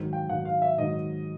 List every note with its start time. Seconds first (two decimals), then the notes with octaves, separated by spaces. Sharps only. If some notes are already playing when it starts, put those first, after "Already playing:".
Already playing: G#2 D#3 F#3
0.13 G5
0.29 G#2 D#3 F#3 F#5
0.45 F5
0.62 E5
0.78 G#2 D#3 F#3 D#5